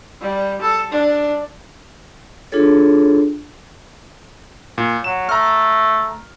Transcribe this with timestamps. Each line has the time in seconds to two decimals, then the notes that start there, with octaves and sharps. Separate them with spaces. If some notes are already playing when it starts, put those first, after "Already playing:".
0.21 G3
0.61 A4
0.92 D4
2.52 D4 F4 G#4 A4 C#5
4.78 A#2
5.04 F#3 E7
5.29 A3 A#5 F6